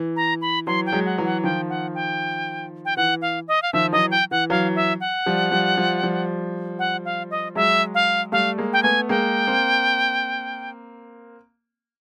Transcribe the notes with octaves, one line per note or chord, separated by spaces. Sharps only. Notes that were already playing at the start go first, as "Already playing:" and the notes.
Already playing: E3
A#5
B5
E3 F#3 C6
G5
F#3 G#3
F#5
E3 F#3
F#5
D#3 F3 G5
F#5
G5
G5
E3 F#5
F5
D#5
F5
D#3 F3 E5
E3 F#3 D#5
G5
E3 F#5
E3 F#3 F5
E5
F#5
F3 G3
F3 G3
F3 G3
F3 G3
F#5
F5
D#5
F#3 G#3 E5
F5
G3 A3 F5
G#3 A#3
G5
A3 B3 G#5
G#3 A#3 G5
A#3 C4